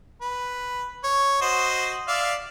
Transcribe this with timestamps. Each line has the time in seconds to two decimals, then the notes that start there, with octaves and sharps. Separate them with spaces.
0.22 B4
1.04 C#5
1.41 F#4 C5 D#5
2.08 D5 E5 F5